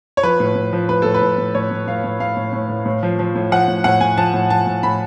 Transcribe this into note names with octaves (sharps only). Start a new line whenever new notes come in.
C#5
F3 B4
A2
A2
F3
A2 B4
A2 A4
B4
A2
A2
A2 C#5
A2
A2 F5
A2
A2 F5
A2
A2
A2
A2
F3
F3
A2
F3 F#5
A2
A2 F#5
A2 G#5
F3 A5
A2
F3 A5
A2
A2 B5